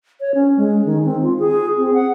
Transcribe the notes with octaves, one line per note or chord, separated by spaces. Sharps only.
C#5
C#4
G#3
D#3
C4
F4
G#4
C4
F#5